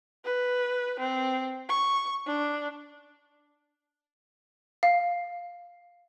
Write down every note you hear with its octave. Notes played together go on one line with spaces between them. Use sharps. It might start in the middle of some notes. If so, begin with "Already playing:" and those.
B4
C4
C#6
D4
F5